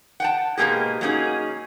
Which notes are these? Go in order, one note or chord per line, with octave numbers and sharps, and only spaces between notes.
F#5 G5 A5
G#2 B2 E3 A#3 G4 G#4
F#3 A#3 C#4 D#4 G#4